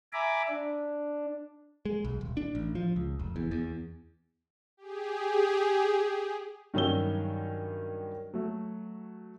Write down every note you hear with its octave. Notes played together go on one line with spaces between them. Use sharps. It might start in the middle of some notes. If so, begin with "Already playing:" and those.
E5 G#5 A#5 B5 D6
D4
G#3
B1
D#1
D4
A1
F3
C#2
F1
E2
E2
G4 G#4
G2 D#3 F#3 C#4 E6 G7
F#3 A3